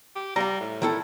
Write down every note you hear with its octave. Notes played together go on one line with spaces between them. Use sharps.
G4
G3 F5 A#5
A2
D#3 E4 A4